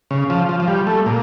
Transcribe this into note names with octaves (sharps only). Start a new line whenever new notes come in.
C#3
F3
F3
F3
G3
A3
A#2